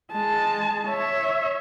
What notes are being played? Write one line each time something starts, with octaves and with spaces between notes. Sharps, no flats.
G#3 A5
C#5 E5